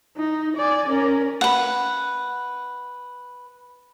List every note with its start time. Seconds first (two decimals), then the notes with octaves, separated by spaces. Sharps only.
0.17 D#4
0.56 D5 G#5
0.88 C#4 A#4
1.41 B4 F#5